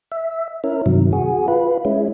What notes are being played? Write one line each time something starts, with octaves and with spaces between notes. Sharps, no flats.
E5
C#4 E4 A#4
G2 C3 D#3 F#3
F#4 G#4
F4 B4
G#3 C#4 E4